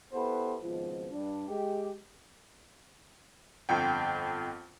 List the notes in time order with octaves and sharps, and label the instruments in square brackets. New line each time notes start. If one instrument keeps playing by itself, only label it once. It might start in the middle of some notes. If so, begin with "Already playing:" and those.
[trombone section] B3 E4 G4 A4 B4 C5
G#1 C#2 B2 F3
G2 D4
G#3 G4
[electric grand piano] G1 F2 F4 G5